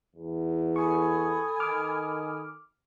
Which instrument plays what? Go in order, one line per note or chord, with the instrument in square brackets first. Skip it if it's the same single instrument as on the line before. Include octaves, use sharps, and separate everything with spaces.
[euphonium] E2
[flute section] A4 B5 D#6 [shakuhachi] G#5 [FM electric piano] C#6
[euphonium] D#3 [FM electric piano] D6 F6